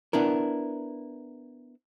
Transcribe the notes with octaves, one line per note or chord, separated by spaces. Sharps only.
B3 D4 E4 A#4